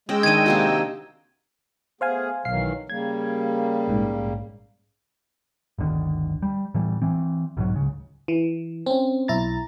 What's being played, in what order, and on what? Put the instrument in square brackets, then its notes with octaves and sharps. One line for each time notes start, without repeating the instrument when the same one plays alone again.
[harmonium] G#3 [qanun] C#4 [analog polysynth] D#5 G5 E6
[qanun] D#3 D4 [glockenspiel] G#6 D#7
[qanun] C3 A#3 F#4
[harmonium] A3 B3 G#4 [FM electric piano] C5 F5 G#5
[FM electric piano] B1 F5 C7 [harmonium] D#3 E3 F#3
[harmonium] C#3 G3 A#3 [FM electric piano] G#6
[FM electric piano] A#1 G#2
[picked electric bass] G1 D2 D3 D#3
G3
A2 E3 G3
E3 C4
B1 G#2 E3 F#3
C#2 C#3
[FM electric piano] E3
C4 C#4
B1 E4 A#5 A6